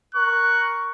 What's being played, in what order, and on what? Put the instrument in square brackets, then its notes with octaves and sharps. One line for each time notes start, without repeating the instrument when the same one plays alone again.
[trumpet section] A#4 C#6 [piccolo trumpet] F#6